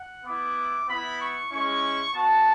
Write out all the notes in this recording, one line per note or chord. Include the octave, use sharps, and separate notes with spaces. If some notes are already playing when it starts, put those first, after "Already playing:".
Already playing: F#5
B3 E4 D6
B3 E4 B5
C#6
G#3 C#4 E4 C#6
B3 F#4 A5